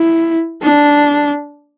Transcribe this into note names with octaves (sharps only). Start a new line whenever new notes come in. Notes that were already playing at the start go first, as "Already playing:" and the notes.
Already playing: E4
D4